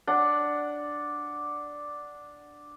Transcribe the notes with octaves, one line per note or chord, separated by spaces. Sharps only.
D4 F#5